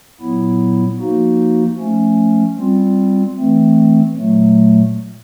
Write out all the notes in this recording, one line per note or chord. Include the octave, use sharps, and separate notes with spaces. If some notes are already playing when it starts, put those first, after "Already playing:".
A#2 F#3 B3 E4
F3 A#3 D#4 F#4
F3 A3 C#4
G3 C4 F4
E3 A3 C4
A#2 F#3 A3